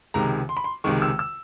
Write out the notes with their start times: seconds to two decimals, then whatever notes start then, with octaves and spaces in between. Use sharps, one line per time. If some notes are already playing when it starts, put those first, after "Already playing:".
0.14 C#2 C3 D#3 G#3 A#5
0.49 C6
0.57 B5
0.64 C6
0.84 C#2 C3 D#3 G#3 C#6
1.02 E6
1.19 E6